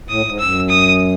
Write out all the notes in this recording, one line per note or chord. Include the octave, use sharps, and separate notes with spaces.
A2 D#6
G#2
F#2 E6
D#6